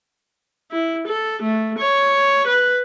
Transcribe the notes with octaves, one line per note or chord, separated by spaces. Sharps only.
E4
A4
A3
C#5
B4